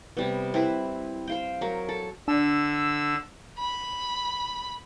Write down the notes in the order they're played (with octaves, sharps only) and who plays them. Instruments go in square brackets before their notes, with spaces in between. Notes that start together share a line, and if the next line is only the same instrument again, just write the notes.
[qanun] C3 G3 B3
C4 E4 B4
C5 F5 G5
F#3 A#4
A4
[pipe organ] D3 E6 [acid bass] D4
[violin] B5